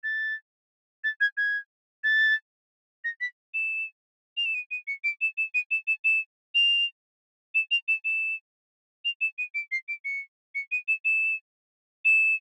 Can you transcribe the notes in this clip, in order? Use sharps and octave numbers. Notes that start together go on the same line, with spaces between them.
A6
A6
G#6
G#6
A6
A#6
B6
E7
F7
E7
D#7
D#7
C#7
D7
E7
E7
D#7
E7
E7
E7
F7
E7
F7
E7
E7
F7
E7
D#7
D7
C7
D7
C#7
C#7
D#7
E7
E7
E7